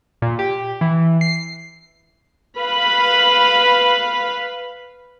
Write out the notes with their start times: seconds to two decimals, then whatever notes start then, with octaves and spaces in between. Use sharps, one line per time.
0.22 A#2
0.39 G4
0.81 E3
1.21 C7
2.59 B4 F5 B5